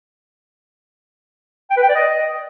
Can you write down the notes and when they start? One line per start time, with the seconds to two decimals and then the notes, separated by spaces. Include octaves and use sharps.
1.71 G5
1.77 B4
1.83 G5
1.89 D5
1.95 D#5